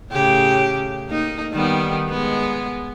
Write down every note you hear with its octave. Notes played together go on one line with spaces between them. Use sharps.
A2 C#3 G4
A#3 D#4
D#3 G3 B3
G#3 B3